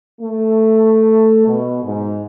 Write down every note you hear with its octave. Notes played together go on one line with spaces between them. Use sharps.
A3
B2
G#2